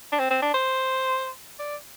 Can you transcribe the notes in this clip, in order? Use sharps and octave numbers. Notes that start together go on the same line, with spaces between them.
D4
C4
C4
D4
C5
D5